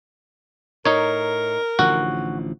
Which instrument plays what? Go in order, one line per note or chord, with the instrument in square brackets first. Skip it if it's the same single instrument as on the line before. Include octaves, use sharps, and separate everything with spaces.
[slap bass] A2 [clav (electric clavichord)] D#4 C#5 [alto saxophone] A#4
[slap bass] A1 D3 F3 [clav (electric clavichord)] F#4